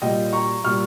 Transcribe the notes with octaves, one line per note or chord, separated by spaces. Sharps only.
A#2 G3 D#5 G5
A#5 C#6
A#2 G3 C#6 F6